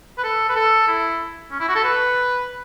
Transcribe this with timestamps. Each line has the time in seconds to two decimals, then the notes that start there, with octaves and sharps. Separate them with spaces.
0.18 B4
0.23 A4
0.49 B4
0.56 A4
0.88 E4
1.51 C#4
1.60 E4
1.68 F#4
1.75 A4
1.84 B4